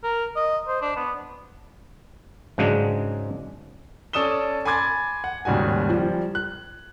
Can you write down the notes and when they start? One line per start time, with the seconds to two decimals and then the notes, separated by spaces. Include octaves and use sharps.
0.04 A#4
0.36 D#5
0.68 C5
0.82 D4
0.96 B3
2.58 G#2 C#3 F#3 G#3 D4
4.13 C#4 A4 D5 D#6 E7 G7
4.65 G#5 B5 C6 D6 G#6 A6
5.24 F#5
5.45 D#2 G#2 C#3 G3 F#4 G#5
5.89 F3 G3
6.35 F#6